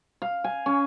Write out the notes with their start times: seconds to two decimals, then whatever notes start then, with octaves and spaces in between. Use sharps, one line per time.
0.22 F5
0.44 G#5
0.66 C#4